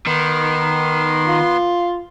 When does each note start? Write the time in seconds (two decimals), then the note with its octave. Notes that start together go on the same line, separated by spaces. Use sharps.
0.07 D#3 B3 C6
1.27 F4